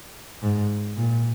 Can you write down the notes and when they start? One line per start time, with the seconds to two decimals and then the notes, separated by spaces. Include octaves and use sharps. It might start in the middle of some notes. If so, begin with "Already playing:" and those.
0.42 G#2
0.97 A#2